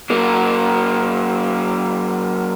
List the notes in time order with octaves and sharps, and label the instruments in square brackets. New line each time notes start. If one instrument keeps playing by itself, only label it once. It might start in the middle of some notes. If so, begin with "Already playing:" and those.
[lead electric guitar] F#3 A#3